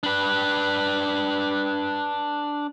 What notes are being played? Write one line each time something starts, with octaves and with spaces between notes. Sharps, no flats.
D4 B4